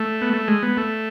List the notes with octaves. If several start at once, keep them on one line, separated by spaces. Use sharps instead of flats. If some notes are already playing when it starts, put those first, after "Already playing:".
Already playing: A3
B3
A3
G#3
B3
A3